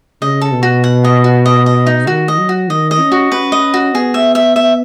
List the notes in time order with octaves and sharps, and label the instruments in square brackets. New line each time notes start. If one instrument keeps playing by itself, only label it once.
[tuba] C#3 [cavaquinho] D#5
[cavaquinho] A4
[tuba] B2
[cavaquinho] F#4
F#5
D#5
F#4
D#5
D#5
D#4
[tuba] D#3 [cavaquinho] F#4
[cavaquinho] D#5
[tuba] F#3
[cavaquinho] F#4
[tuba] D#3 [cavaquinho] D#5
[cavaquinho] D#5
[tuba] C#4
[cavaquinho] F#4
[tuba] C#4 [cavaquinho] B4
[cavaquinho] D#5
F#4
[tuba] B3 [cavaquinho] G#4
[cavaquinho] E5
E5
E5